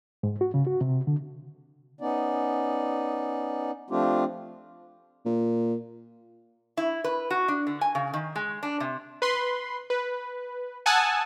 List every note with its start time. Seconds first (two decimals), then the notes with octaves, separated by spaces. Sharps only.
0.23 G#2
0.41 F#4
0.54 C#3
0.67 F#4
0.81 C3
1.07 D3
2.01 B3 C#4 D#4 D5
3.90 F3 A3 C4 D4 F4 G4
5.26 A#2
6.77 E4
7.04 B4
7.31 F#4
7.48 D4
7.67 D3
7.81 G#5
7.95 C#3
8.14 D#3
8.36 G#3
8.63 D4
8.80 C3
9.22 B4 B5 C6
9.90 B4
10.86 F#5 G#5 A5 D#6 E6 F#6